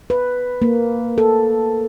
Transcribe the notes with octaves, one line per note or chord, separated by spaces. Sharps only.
B4
A#3
A4